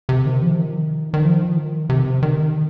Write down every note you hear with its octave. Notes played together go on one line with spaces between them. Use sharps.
C3
D#3
F3
D#3
D#3
F3
D#3
C3
D#3